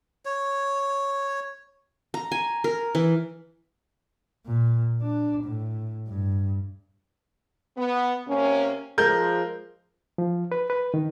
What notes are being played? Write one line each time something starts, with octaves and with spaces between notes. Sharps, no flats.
C#5
A#5
G#5
A#4
E3
A#2
D4
A2
G2
B3
C3 A#3 C#4
F3 G#3 A#4 G6
F3
B4
B4
D#3